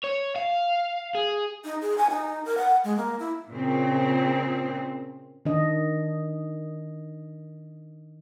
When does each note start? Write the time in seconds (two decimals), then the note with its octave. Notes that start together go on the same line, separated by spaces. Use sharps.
0.04 C#5
0.36 F5
1.15 G#4
1.64 D#4
1.82 G#4
1.98 G#5
2.10 D#4
2.45 A#4
2.58 F#5
2.84 G#3
2.97 A#3
3.19 E4
3.50 A#2 C#3 C4
5.45 D#3 D4 D#5